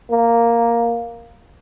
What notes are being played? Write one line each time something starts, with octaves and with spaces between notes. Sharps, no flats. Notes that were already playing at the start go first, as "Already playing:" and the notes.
A#3